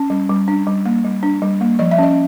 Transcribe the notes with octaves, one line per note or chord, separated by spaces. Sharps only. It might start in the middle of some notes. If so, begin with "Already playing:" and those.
Already playing: C#4
G3
G3
D4
G3
A#3
G3
D4
G3
A#3
F3 D#5
E5
C#4 D#5